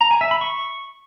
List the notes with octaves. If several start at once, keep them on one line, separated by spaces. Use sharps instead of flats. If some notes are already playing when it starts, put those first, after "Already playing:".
A#5
G#5
E5
B5
C#6